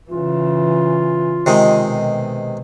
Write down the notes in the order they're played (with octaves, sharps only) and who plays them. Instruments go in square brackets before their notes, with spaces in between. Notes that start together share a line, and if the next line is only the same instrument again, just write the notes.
[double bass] C#3 E3 [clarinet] F4
[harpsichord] C3 D#3 G#3
[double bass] B2